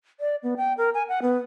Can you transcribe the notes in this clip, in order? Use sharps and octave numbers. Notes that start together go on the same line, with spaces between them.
D5
B3
G5
A#4
G#5
F#5
B3